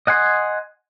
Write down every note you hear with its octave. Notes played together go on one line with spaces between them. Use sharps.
D#5 F#5 G#5 C6